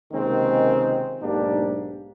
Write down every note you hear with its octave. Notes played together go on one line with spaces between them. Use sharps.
C#2 C3 D#3 G#3 A#3 C4
B1 G#2 A#3 D4 G4